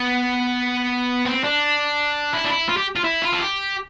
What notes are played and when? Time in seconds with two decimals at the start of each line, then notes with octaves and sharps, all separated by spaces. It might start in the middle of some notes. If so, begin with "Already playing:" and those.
Already playing: B3
1.26 C4
1.44 D4
2.33 E4
2.44 D4
2.50 E4
2.69 F4
2.77 G4
2.96 F4
3.04 E4
3.22 F4
3.32 A4
3.40 G4